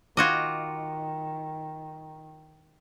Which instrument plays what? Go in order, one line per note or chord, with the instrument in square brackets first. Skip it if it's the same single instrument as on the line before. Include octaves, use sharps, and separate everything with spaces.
[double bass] D#3 [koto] F4 F#4 D#5 [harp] D6 F#6 G#6